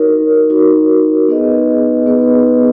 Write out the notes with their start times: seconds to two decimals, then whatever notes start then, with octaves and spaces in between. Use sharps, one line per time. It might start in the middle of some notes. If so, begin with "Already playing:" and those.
Already playing: D#4 F#4 A#4 C#5
0.49 D#4 F#4 A#4 C#5
1.28 B3 D#4 G#4 B4 D#5
2.07 B3 D#4 G#4 B4 D#5